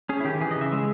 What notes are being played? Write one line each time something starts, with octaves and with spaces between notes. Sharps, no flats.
C#4 G#4
E4
D#3 G4
E3 G#4
D#5
C#3
E5
G#3